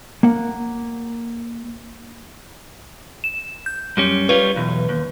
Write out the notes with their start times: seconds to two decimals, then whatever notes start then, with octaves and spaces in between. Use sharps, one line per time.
0.23 A#3 F#5
3.24 E7
3.66 G6
3.97 F#2 G3 C#4
4.29 G3 F4 B4 C#5
4.56 B1 E2
4.89 D#2